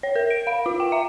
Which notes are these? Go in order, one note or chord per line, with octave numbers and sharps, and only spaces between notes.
C#5
A#4
D7
F5
F4
G5
E5